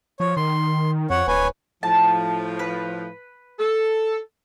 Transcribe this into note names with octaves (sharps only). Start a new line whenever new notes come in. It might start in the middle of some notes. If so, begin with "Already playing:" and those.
F3 C#5
D#3 C6
F2 C#5 F#5
D1 B4 C#5 G#5
A2 F3 A5
B4
A4